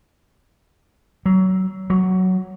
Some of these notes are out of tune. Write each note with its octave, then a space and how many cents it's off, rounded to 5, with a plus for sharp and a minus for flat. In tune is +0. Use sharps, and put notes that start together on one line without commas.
F#3 +25
F#3 +5